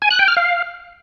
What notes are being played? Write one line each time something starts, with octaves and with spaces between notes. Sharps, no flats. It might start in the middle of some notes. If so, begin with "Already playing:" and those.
G#5
F#6
G5
F6
F5